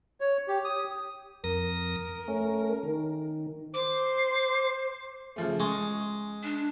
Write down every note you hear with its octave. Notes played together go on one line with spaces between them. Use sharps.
C#5
G4
D#6
F2 A#4 D#6 A#6
A3 C#4
D#3
C5 D6
C#3 F3 A3
G#3 C#6
D4